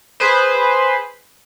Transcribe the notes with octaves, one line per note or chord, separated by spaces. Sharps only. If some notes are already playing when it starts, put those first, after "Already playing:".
G#4 B4 C5